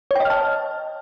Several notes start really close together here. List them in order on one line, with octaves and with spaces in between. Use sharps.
C#5 G5 D#5 F6 A5